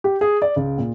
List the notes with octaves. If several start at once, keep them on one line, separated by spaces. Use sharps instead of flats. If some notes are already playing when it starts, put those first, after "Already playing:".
G4
G#4
D5
C#2
A#2